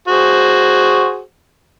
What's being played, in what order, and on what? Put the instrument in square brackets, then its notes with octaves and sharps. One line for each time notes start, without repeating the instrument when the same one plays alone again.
[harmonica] F#4 G#4 C5